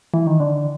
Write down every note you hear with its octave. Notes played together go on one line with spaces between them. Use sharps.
E3
D#3
D3